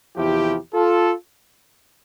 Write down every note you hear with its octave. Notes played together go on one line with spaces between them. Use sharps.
E2 C3 F3 E4 G4
F4 A4